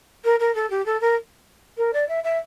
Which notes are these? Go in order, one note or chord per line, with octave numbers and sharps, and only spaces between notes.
A#4
A#4
A4
G4
A4
A#4
A#4
D5
E5
E5